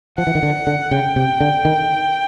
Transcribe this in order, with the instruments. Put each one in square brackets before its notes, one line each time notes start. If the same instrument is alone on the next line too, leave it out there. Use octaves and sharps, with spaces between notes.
[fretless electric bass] F3 [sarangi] F#5
[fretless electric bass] E3
D#3
D3
D3
[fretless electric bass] C#3 [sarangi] G5
[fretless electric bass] C3
D3
D#3